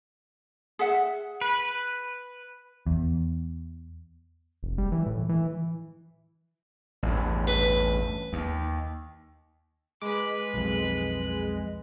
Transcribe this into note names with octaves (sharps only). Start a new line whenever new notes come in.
G#4 E5 F#5
B4
E2
F1
G3
E3
A2
E3
A1 E2 G2
B4
D#2
G#3 B4 D6
B1 F2